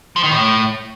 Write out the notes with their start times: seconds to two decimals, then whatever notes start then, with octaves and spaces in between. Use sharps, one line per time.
0.16 F3
0.23 D#3
0.31 A2